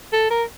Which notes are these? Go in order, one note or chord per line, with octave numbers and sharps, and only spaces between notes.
A4
A#4